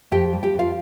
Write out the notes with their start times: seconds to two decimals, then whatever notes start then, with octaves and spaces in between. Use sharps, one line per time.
0.11 F2 G4 G5
0.33 G3
0.43 G4 G5
0.54 F2
0.59 F4 F5